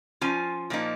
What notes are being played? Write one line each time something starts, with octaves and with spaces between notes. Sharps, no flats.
F3 C#4 F4 G#5
A#2 F3 A#3 D#4